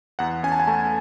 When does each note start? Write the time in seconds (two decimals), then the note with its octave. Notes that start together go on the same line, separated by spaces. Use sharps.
0.19 E2 F#5
0.43 C#4 G#5
0.52 A5
0.60 G#5
0.67 A3 A5